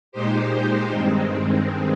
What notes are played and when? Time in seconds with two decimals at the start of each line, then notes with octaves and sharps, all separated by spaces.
0.12 A#2 G#3 D#4 G4 C5
0.90 G2 D#3 G#3 C4